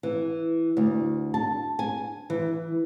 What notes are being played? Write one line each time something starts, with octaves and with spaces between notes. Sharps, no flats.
E3
D2
A5
G#5
E3